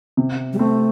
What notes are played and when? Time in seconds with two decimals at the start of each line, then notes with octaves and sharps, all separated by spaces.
0.17 C3
0.53 G3
0.59 A3 C4